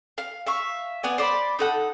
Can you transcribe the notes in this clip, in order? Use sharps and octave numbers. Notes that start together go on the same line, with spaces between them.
F5
E5 F5 C#6
B3 D5 G#5
C5 D5 B5
D#4 A4 F#5